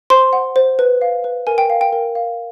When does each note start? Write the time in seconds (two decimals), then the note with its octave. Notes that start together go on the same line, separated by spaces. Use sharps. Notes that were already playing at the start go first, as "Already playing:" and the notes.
0.10 C5 C6
0.33 F#5
0.56 C5
0.79 B4
1.01 F5
1.24 B4
1.47 A#4 G#5
1.58 G5
1.70 F5
1.81 G5
1.93 A#4
2.15 F5